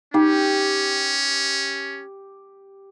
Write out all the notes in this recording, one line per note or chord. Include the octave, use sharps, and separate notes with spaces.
C#4 D#4 G4